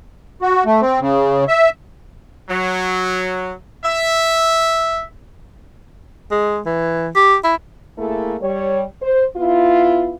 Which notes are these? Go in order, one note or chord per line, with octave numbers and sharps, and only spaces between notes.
F#4
A3
C4
C#3
E5
F#3
E5
G#3
E3
G4
E4
A3 A#3 E4 G#4 A4
G3 C#5
C5
B3 E4 F4